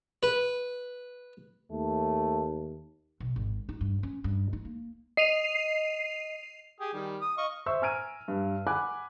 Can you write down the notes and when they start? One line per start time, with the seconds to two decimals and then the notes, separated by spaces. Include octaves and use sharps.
0.23 B4
1.72 D#2 A3
3.20 B1
3.36 G#1
3.69 D#4
3.81 G2
4.03 C#4
4.24 G2
4.53 D#4
4.65 A#3
5.17 D#5 C7 D#7 F7
6.80 G4 G#4 D#6
6.94 D#3 G3
7.21 D#6
7.38 D#5 F5 C#6
7.66 C5 E5 C#6 E6
7.82 G#5 A#5 F6 G#6 D7 D#7
8.28 G2
8.67 F#5 G#5 B5 D6 F#6